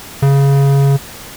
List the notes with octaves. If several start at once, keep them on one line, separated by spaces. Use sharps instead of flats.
C#3